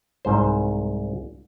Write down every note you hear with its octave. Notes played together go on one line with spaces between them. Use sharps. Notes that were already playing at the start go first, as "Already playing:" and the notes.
C2 G#2 C5